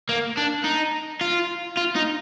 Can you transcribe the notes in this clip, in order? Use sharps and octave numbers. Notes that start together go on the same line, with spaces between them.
A#3
D4
D#4
F4
F4
D#4